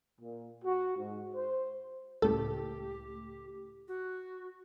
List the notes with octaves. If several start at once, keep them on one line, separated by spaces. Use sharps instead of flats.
A#2
F#4
G#2
C5
C#2 A2 A3 G4 A4
F#4